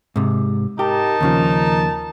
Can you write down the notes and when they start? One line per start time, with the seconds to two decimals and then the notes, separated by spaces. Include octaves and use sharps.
0.16 G#2 C3
0.79 D#4 G4 A#4 A5
1.21 D#2 C#3 F3